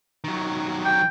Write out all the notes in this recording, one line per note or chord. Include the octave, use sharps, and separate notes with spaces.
D#3 F#3
G5